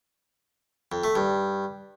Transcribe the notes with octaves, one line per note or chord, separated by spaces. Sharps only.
F2
A3
G2